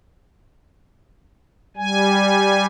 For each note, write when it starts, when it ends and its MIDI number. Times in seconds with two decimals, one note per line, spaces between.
1.77 2.66 55
1.77 2.66 80